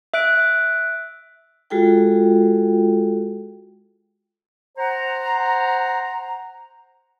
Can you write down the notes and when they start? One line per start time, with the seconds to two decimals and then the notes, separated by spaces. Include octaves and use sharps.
0.14 E5 F#6 D7
1.70 G#3 F4 F#4 G#4 A4 G5
4.78 C5 F#5 A#5